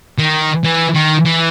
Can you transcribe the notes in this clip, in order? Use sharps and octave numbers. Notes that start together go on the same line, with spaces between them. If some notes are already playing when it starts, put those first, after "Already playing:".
D#3
E3
D#3
E3